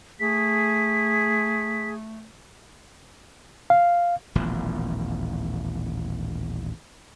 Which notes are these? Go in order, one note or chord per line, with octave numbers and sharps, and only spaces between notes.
A3 G#4 B6
F5
D#1 A1 B2 F3